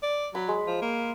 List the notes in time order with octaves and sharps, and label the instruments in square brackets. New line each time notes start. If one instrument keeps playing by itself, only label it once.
[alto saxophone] D5
[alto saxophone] F#3 [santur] B5
[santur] G#3
[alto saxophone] F3
A#3